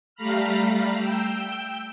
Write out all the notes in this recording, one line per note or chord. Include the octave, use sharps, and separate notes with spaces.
G3 A3 F5 A#5 B5 F6
G5 E6 G6